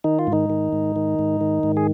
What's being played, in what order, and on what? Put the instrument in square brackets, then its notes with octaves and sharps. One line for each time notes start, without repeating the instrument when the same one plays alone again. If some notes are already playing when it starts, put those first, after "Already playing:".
[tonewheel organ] D#3 D#4
F4
G#2
D#3 D#4
D#3
G#2
D#3
G#2
D#3
G#2
G#4